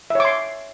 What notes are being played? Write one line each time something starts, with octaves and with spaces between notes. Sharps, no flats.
C#5 E5 C6 D6